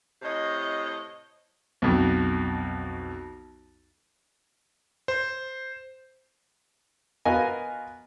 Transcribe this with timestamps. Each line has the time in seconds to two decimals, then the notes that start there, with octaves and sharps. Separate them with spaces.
0.22 A2 C3 C#5 D#5
1.82 B1 F2
5.08 C5
7.25 B3 F4 F#4 A#4 D#5 G#5